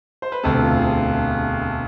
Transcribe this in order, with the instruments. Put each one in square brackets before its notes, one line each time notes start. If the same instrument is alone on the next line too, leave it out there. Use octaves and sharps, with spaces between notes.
[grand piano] C5
B4
E1 D2 C3 A4
F4
G#4